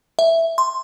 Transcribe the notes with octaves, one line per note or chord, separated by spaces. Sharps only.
E5
C6